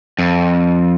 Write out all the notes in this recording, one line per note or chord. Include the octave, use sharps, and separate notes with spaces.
F2